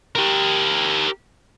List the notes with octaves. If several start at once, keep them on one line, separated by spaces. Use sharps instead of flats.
G4 A#4